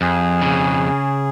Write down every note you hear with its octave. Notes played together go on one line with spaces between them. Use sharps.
F2 G#4
C#3